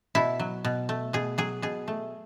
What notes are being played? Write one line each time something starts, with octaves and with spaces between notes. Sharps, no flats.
B2 E4
F#3
B2
A3
B2 G#4
F#3 G#4
B2 G#4
A3